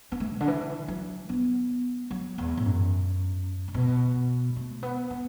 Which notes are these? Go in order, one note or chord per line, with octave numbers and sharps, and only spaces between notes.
B3
A3
B2
D3
E3
F#3
B3
F#3
E2
A2
F#2
D3
B2
A3
B3
B3